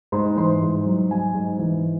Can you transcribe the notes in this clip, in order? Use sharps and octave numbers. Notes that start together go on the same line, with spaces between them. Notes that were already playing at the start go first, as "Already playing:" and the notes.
G#2 C5 C6
E3 C5 C6
G#2
F#3
F#3 G#5
G#2
E3